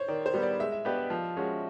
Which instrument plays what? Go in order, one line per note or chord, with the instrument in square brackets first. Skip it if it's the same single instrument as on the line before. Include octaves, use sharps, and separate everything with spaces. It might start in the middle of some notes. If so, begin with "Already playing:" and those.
Already playing: [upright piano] C5 C#5
[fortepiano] D#3 [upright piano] D5
[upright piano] C5
[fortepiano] G3 B3
[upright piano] D5
[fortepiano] G#3 [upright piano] E5
[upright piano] E5
[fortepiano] B3 D4 G4 B4 [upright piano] D#5
[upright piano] D5
[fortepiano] F3
G#3 C#4 F#4